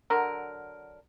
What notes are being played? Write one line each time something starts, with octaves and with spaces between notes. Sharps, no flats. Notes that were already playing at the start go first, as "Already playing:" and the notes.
D3 F#3 A#4